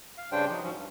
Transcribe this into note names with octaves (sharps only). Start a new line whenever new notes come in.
F5
G2 C#3 G3 D4 C5 G5
F3 F#3 D#4
G#2 F3 F#3 C#4
G2